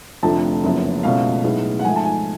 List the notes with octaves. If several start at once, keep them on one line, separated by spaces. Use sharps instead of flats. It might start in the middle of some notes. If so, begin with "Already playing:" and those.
F1 F2 D3 F3 A3 A5
F#1 F#2 C#3 F3 B3
C#2 B2 A3 C#4 F5
B1 A2 G#3 B3
F#5
G#2 F3 A3 G#5
A5
G#5